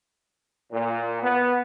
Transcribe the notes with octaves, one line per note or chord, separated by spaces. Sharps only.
A#2
B3